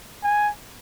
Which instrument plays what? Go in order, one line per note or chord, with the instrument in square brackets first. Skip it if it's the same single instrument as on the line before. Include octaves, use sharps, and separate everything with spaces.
[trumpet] G#5